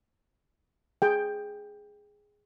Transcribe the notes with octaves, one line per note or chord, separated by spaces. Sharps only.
G#4 G5